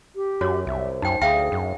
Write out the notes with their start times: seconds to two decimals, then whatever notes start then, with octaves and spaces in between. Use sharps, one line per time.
0.16 G4
0.41 F#2 F#4 C#5
0.67 C2 E5
1.02 F#2 D#4 C5 G5
1.21 D2 G#4 E5 F5 G5
1.52 F#2